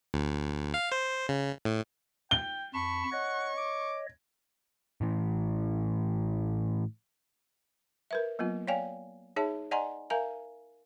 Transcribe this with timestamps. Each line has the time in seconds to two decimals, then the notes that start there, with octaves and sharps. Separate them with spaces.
0.14 D2
0.74 F5
0.92 C5
1.29 C#3
1.65 A2
2.31 G5 G7
2.74 F2 A5 B5 C#6
3.12 C#5 D#5 F#5
3.58 D6
5.01 A2 E3
8.11 A#4 B4 E5
8.39 F#3 A#3 B3 F4
8.68 C#5 D5 F5 G5 G#5
9.36 D#4 G#4 C#5 E5 A5
9.71 D5 D#5 F#5 G#5 A#5 C6
10.10 A#4 E5 F5 G#5 A#5